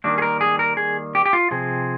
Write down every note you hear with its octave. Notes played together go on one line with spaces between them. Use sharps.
D#3 G3 A#3 D4
G#4
A#4
G#4
A#4
G#4
G4
G4
F4
C3 F3 C4 G#4